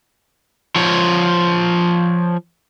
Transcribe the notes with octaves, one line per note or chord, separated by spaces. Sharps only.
F3 C#5